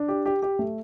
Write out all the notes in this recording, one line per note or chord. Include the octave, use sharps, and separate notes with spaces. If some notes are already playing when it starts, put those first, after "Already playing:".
Already playing: D4
G4
G4
G4
A3